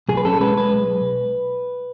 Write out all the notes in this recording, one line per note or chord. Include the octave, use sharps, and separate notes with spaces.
B1 G#4
B4
C#4 A4
G#3 B4
G#3 B4
B1